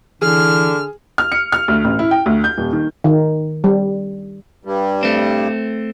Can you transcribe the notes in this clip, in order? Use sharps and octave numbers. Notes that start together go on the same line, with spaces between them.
D3 E3 G#4 F6
F6
C#7
F6
D2
A1
E4
G5
D2
G6
D#1
D#3
D#3
G3
G2 G3
A3 C4